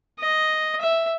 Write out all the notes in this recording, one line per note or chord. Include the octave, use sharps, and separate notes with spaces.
D#5
E5